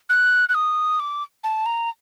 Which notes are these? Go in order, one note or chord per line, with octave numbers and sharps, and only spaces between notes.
F#6
F#6
D#6
D6
A5
A#5